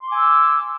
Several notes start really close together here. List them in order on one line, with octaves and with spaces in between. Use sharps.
C6 D6 G#5 E6